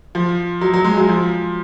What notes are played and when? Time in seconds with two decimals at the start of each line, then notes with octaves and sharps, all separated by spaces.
0.15 F3
0.61 F#3
0.74 F#3
0.84 G#3
0.97 F#3
1.09 F3